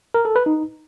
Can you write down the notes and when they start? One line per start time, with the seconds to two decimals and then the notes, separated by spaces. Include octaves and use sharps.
0.14 A#4
0.25 A4
0.36 B4
0.46 D#4